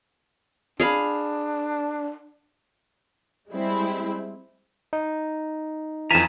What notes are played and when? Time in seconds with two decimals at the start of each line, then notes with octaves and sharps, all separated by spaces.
0.80 D4 G#4 F5 B5
3.50 G3 G#3 C4 E4
4.93 D#4
6.11 F2 E3 F4 G#5 A#5 B6 E7